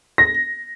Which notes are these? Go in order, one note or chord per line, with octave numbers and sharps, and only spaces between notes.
A#6